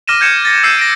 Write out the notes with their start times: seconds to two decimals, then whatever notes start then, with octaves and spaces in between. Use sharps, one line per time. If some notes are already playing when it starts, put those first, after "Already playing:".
0.08 D6 F6 A#6 D#7 E7
0.20 F6 G6 G#6 C#7 E7
0.45 A6 A#6
0.63 E6 G6 C7 D#7
0.79 A#6 D7